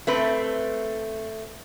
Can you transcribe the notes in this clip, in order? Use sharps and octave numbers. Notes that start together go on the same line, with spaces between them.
A3 C4 B4